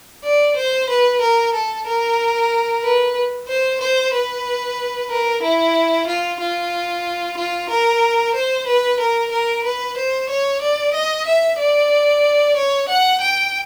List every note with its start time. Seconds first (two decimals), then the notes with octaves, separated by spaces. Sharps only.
0.24 D5
0.56 C5
0.89 B4
1.21 A#4
1.54 A4
1.86 A#4
2.83 B4
3.48 C5
3.81 C5
4.13 B4
5.10 A#4
5.42 E4
6.07 F4
6.40 F4
7.37 F4
7.70 A#4
8.34 C5
8.67 B4
8.99 A#4
9.31 A#4
9.64 B4
9.97 C5
10.29 C#5
10.61 D5
10.94 D#5
11.26 E5
11.59 D5
12.56 C#5
12.89 F#5
13.21 G5